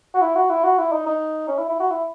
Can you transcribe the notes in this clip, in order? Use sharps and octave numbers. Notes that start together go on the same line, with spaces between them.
F#4
E4
F#4
E4
F#4
E4
D#4
D#4
C#4
E4
E4
F#4
E4